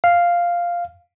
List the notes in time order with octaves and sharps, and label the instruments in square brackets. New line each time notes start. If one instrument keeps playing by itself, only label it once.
[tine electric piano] F5